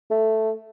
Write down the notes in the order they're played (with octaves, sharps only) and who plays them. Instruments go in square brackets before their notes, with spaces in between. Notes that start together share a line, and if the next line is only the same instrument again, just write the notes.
[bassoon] A3